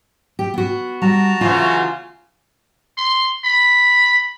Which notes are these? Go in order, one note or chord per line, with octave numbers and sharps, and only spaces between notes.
G4
B3 F#4
G3 F#4 A5 A#5
C#3 E3 F#3 F4
C6
B5